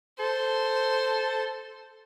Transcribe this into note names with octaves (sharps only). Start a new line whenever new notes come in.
A4 C5